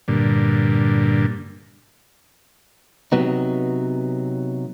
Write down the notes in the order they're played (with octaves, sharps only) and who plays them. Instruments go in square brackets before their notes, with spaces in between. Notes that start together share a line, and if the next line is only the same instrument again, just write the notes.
[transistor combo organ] G2 A#2 D3
[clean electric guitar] C3 F#3 B3 D#4